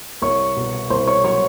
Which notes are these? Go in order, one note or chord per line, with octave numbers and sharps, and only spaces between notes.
C2 C#5 C#6
B2
C2 C5 C6
C#5 C#6
F#3 C#5 C#6